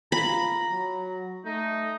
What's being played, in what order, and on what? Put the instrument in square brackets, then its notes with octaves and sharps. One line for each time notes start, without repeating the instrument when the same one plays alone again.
[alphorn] F4 [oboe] A#5 [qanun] B5
[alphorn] F#3
[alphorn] A3 [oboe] D#4